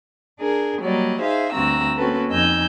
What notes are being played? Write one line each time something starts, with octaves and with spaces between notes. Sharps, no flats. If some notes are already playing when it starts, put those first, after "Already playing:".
D4 G#4 A#4
F#3 G3 A#3 D5 D#5
D#4 G#4 C5 E5 F5
D2 G2 C4 F#4 A#5 E6
A#3 C4 C#4 F#4 A4 B4
F2 D#4 D#5 G#5 E6 G6